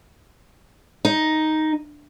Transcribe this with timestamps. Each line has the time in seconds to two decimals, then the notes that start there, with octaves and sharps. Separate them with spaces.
1.05 D#4